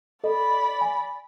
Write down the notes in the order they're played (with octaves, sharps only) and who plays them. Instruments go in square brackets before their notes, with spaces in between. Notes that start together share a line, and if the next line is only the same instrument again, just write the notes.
[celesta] A4 D#5 [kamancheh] D5 B5
[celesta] G#5